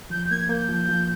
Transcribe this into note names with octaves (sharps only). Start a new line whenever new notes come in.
F3 G6
A#3 G#6
A#3 G6
F3
F3